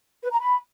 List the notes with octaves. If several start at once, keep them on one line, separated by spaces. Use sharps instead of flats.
B4
A#5
B5